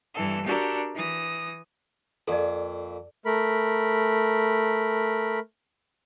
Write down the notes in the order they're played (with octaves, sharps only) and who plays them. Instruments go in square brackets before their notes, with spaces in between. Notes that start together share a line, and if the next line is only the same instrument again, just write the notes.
[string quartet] G2 E3 A4
D4 F#4 G4 A4 A#4
E3 D#6 A#6
[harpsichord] F2 A#2 [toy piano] A4 D5
[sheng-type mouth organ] A3 A#4 B5